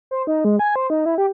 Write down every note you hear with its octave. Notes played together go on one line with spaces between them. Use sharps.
C5
D#4
G#3
G#5
C5
D#4
E4
G4